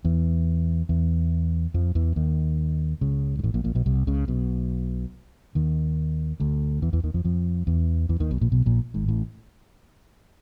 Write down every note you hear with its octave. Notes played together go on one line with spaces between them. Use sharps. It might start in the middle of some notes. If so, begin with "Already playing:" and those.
E2 E3
E2 E3
F2 F3
E2 E3
D#2 D#3
C#2 C#3
G#2
A1 A2
A#1 A#2
A#1 A#2
B1 B2
C2 C3
C#2 C#3
B1 B2
D#2 D#3
D2 D3
E2 E3
E2 E3
D#2 D#3
F2 F3
F2 F3
E2 E3
E2 E3
D#2 D#3
B1 B2
A#1 A#2
B1 B2
A#1 A#2
G#1 G#2
A1 A2